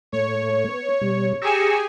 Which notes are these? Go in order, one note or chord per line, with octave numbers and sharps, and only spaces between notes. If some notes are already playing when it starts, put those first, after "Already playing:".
A2 A3 C#5
B3
B2 G3
G4 G#4 G#5 A#5 C#6 E6